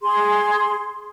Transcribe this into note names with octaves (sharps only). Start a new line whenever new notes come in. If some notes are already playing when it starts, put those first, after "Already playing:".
G#4 C6